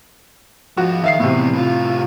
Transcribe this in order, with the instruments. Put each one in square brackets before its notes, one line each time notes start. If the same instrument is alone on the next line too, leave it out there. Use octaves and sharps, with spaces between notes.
[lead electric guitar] G#2 F3 [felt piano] F#4
[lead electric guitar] D#3 [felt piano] E5 F5 C7
[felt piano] A2 C3 [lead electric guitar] E3 B3
[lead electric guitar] C2 F4